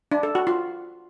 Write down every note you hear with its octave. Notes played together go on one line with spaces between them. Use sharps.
D4
A4
F#4
F4